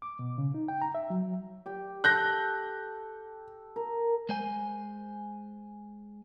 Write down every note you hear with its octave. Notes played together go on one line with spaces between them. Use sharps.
D6
B2
C#3
D#4
G5
A#5
E5
F#3
G4 G5
A4 F#6 G6 A#6
A#4
G#3 C5 G#5